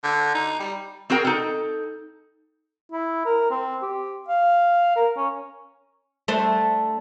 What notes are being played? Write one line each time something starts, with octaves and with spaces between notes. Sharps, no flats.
D3
D#4
G3
C4 F#4 G#4 A#4 G5
D#4 A4
E4
A#4
C4
G4
F5
A#4
C#4
A3 D4 C5